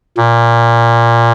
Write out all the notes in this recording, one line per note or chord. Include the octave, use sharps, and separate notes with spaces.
A#2